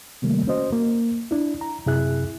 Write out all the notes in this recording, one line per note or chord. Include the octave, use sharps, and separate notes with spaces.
C3 D#3 G3 A3 A#3
C#4 F#4 C5 D#5
A#3
D4 E4
A#5
F#2 C3 E4 G#4 E5 F#6